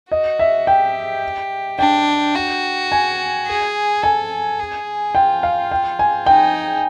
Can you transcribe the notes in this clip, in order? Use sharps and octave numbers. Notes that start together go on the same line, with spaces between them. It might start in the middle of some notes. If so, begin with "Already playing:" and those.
F#4 D#5
E5
G4 G5
D4 G5
F#4
G#5
G#4
A4 G#5
G#4
F4 G5
F5
G5
G#5
D#4 G5